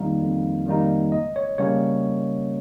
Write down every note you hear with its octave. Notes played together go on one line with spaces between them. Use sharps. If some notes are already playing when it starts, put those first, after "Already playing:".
Already playing: F2 D#3 G3 A#3 D#4 F5
F2
D#3 G3 A#3 D#4
C#2 D#5
C#5
C#3 G3 A#3 C#4 C#5